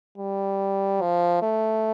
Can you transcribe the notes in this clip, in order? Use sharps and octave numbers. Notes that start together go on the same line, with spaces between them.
G3
F3
A3